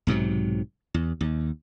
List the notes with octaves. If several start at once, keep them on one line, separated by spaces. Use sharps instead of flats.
B1 G#2 C3 F#3
E2
D#2